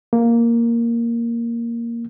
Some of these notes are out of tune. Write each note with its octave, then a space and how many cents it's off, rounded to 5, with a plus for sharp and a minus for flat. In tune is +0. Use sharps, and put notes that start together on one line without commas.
A#3 +0